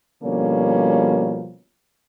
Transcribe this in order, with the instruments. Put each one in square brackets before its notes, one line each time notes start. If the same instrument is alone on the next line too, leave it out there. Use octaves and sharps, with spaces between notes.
[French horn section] B2 D3 F3 G3 A#3 C#4